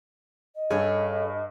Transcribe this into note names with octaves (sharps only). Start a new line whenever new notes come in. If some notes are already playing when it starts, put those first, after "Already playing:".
D#5
G2 C#4 G#4 A4 C#5